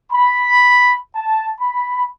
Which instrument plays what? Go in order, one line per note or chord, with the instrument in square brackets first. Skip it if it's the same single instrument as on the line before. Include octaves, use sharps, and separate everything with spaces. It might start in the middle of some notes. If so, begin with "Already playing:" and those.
[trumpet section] B5
A5
B5